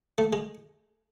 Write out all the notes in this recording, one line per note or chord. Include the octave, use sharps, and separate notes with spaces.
A3
G#3